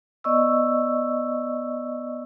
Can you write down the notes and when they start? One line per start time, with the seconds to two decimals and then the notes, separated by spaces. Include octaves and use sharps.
0.24 B3 D5 D#5 C#6 E6